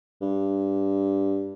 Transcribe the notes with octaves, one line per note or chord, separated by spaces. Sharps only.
G2